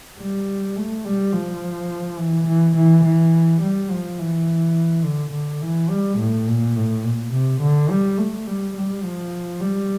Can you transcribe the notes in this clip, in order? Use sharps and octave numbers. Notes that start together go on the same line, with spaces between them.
G3
A3
G3
F3
E3
E3
E3
E3
G3
F3
E3
D3
D3
E3
G3
A2
A#2
A2
A#2
C3
D3
G3
A3
G3
G3
F3
G3